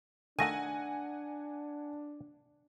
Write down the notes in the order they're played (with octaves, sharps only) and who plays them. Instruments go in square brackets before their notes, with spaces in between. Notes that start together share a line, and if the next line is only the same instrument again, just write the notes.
[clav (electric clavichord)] D#3 A3 [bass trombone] D4 [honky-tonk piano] F#5 G#5 [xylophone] A#6 D#7